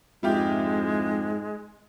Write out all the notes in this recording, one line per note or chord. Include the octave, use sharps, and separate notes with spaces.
F2 G#2 G#3 E4 F4 G4